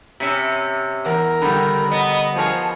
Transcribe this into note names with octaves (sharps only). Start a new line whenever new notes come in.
C3 C#4 E5 B5
E2 A#4
D3 D#3 G3 B5
B3 D#5
F3 G#4 A#4 C#5 A5